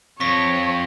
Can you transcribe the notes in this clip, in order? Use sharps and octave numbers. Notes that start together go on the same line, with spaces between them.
F2 C#5 C#6 A#6 B6